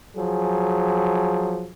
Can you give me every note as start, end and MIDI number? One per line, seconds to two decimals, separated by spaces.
0.16 1.69 53
0.16 1.69 54
0.16 1.69 68